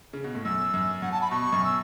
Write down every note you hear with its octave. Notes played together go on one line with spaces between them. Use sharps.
C#3
B2
A2
F#2 E6
F#2
F#2 F#5
A5
B5
B2 C#6
F#2
E6